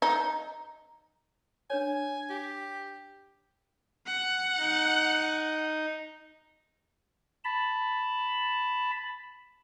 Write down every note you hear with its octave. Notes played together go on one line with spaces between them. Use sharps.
D#4
D4 B4 C#5 G#5
G4
F#5
D#4 D#5
A5 B5